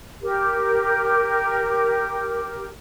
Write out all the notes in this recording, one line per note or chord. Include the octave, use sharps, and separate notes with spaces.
G4 A#4